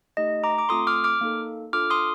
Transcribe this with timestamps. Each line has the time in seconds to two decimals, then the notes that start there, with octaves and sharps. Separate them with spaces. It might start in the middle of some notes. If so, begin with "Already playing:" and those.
0.17 A3 D#4 G4 D#5
0.44 A#5 D6
0.58 D6
0.69 A3 C4 F4 A4 C6 D#6
0.87 D6 F6
1.04 D6 F6
1.21 A#3 D#4 A4
1.73 D4 F4 A4 D6 F6
1.90 C6 D#6